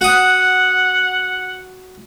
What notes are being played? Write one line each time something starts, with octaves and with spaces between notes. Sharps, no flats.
F#4 F#5 D#6